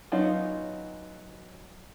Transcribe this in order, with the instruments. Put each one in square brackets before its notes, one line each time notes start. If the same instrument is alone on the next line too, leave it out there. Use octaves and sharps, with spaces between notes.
[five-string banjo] F#3 B3 C#4 D#4 F4